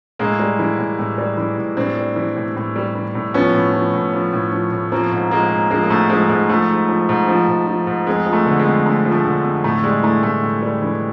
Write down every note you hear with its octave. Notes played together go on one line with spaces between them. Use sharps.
A2 G#3 A#3
G3
E3
A2
A2
G3
E3
A2
A2 C4 D4
G3
E3
A2
A2
G3
E3
A2
F3 B3 C#4
A2
F3
A2
F3
A2
F3
A2
F3 A#3 C4
G#2
F3 G#3 A#3
G#2
F3 G#3 A#3
A#3
G#2 A3
F3 G#3
G#2 G#3
F3 A3
G#2
F3
G#2
F3
G#2
F3
G#2
F2 G#3
F3
A3
D3
G#3
F2
F2 A3
F3
A3
D3
F2
A2 A3
G3 G#3
E3 A3
A2 A3
A2
G3
E3